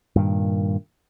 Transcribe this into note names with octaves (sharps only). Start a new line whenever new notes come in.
G2 A#2 D#3